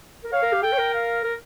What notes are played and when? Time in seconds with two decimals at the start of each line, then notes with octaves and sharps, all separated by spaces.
0.24 A#4
0.32 C#5 F5
0.43 A#4
0.53 G4
0.63 A4 G5
0.73 C#5
0.78 A#4
0.94 F5
1.24 A#4